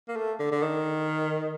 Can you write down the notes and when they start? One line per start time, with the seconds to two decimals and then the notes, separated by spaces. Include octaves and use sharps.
0.08 A#3
0.16 A3
0.40 D3
0.52 D3
0.62 D#3